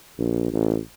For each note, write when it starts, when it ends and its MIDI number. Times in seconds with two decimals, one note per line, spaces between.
0.18 0.48 34
0.52 0.78 33